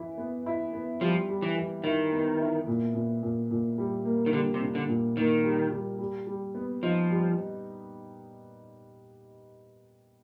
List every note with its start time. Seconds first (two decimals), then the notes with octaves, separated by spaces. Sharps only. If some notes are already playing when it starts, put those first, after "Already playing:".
Already playing: E3 E4
0.18 B3
0.46 E4
0.73 B3
1.01 F3 G3
1.29 G3
1.42 E3
1.56 E3
1.84 D#3 E4
2.12 B3
2.39 E4
2.67 A#2
2.95 A#2
3.23 A#2
3.51 A#2
3.78 G3
4.05 A#3
4.26 D#3
4.33 D3 G3
4.54 C3
4.61 D4
4.75 D3
4.88 A#2
5.16 D#3 A#3
5.43 G3
5.72 G3
5.99 G3
6.27 G3
6.55 B3
6.83 F3 D#4
7.10 G3